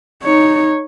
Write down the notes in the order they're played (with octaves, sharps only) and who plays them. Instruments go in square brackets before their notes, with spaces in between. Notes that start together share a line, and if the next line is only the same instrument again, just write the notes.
[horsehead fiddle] D#4 C#5